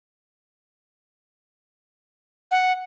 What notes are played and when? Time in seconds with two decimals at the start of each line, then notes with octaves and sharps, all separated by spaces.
2.51 F#5